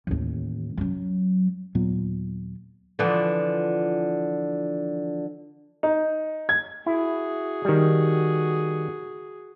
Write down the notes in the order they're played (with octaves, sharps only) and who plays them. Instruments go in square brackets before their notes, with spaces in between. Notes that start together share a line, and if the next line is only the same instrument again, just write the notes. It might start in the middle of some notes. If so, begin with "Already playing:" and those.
[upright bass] A1 D#2
F#2 F#3
[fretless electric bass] D#2 A#2 F#3 B3
[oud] D3 E3 F3
[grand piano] D#4
G#6
[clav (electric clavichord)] E4 [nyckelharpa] F#4 G#4
[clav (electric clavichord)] D#3 G3